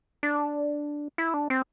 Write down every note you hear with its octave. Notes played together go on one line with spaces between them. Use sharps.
D4
E4
D4
C4